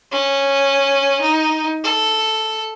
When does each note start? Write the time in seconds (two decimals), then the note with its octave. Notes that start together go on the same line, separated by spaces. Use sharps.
0.11 C#4
1.21 D#4
1.83 A4